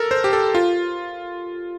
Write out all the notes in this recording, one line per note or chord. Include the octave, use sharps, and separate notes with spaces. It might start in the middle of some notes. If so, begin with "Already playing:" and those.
Already playing: A4 A#4
C5
G4
A4
F4